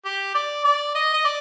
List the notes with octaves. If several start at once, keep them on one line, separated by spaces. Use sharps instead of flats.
G4
D5
D5
D#5
D#5
D5